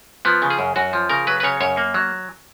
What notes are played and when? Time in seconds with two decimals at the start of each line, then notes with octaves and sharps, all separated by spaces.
0.25 F3 B3
0.42 C#3
0.50 G#4
0.59 F#2
0.76 F#2 F#4
0.93 F3
1.09 C#3 A#4
1.27 F#3 B4
1.40 B4
1.43 C#3 C#5
1.61 F#2 C#5
1.77 A#3
1.94 F#3